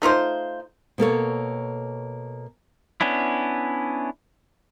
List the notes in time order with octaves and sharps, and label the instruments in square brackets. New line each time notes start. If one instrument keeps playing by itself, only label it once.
[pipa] A3 D#4 F4 C5
[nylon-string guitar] B2 A#3 A4 C#5
[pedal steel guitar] B3 C#4 D4 E4